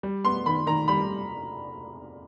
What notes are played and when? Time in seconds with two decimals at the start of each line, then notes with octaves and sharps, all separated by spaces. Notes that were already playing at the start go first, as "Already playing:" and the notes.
0.03 G3
0.25 B3 C6
0.46 D#3 B5
0.66 D#3 A#5
0.88 G3 B5